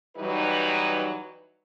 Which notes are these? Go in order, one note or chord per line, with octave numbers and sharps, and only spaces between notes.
E3 F#3 G3 D#4 B4